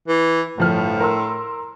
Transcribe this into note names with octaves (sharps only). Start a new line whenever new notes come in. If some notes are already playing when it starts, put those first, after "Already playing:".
E3
G1 A2 F3 F6
A#4 C6 E6